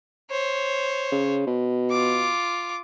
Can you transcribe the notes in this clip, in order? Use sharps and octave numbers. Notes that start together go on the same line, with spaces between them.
C5 C#5
C#3
B2
F4 D6